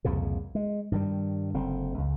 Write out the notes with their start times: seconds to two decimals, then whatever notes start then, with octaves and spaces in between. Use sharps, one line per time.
0.05 C2 F2 A#2 C#3
0.55 G#3
0.92 G2 D#3 G3
1.54 F#1 D3 C4
1.98 C#2